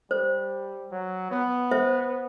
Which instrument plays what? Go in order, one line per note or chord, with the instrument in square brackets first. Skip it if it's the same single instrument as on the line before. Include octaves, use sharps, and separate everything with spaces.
[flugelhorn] G3 [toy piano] C5
[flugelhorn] F#3
B3
[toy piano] C5 E5